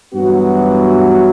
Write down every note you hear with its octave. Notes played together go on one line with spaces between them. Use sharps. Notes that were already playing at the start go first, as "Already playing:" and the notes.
G2 E3 F#3 B3 F#4